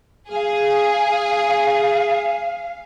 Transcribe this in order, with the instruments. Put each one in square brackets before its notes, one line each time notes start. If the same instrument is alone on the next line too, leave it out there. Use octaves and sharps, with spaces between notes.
[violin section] G#4 [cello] F5